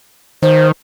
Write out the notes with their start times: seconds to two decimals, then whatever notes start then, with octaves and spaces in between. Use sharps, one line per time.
0.43 D#3 C5